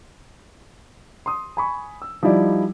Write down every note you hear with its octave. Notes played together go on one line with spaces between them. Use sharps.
C6 D#6
G#5 B5 C#6
E6
F3 G3 D#4 E4 D5